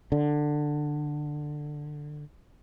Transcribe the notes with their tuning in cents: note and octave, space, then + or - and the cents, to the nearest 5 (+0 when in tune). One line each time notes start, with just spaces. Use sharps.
D3 +15